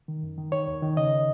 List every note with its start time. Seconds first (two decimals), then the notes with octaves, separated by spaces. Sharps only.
0.08 D#3
0.23 F#2
0.38 D#3
0.52 D#3 C#5
0.68 D#2
0.82 D#3
0.97 C#3 D#5